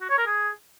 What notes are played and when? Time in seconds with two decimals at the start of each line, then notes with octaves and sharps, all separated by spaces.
0.01 F#4
0.10 C#5
0.18 A#4
0.27 G#4